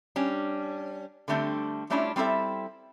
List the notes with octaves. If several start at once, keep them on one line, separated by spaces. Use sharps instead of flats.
G3 C#4 D4
D3 G3 A3 C4 D4
G3 A3 C#4 D4 E4 F4
G3 C4 E4 A4 E5